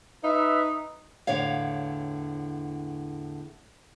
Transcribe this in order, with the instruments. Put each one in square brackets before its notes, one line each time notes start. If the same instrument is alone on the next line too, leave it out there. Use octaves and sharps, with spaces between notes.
[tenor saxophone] D#4 [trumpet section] B4 E5
[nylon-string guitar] E2 A2 D3 C#5 F5